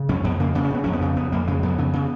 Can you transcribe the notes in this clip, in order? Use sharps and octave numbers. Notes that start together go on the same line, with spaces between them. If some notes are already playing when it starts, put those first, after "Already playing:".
Already playing: C#3
F2 C#4
F2 B3
C#3 A#3
C#3 B3
C#4
C#3 B3
F2 C#4
B3
C#3
F2 B3
F2 A#3
C#3 G#3
F2 B3
C#3
C#3